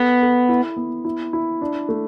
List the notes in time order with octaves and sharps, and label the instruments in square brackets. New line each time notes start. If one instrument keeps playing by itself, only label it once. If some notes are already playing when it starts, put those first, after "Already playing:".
Already playing: [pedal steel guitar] B3 [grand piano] A4
[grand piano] A4
E4
B3
E4
E4
D4
A3